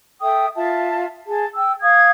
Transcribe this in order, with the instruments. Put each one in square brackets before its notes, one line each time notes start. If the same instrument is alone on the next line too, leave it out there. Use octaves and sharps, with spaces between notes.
[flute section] A4 E5 G5 D#6
F4 E5 A5
G#4 A5
G5 E6
F5 D#6 G#6